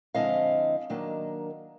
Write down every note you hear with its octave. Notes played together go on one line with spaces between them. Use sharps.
D3 F3 G#3 C4 E4 D#5 F5
D#3 F#3 A#3 D4